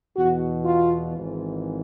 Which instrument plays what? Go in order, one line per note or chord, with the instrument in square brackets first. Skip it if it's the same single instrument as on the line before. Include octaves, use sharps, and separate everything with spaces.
[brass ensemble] E2 B2 F#4
F4
G#1 G#2 E3